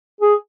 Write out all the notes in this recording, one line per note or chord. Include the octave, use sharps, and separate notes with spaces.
G#4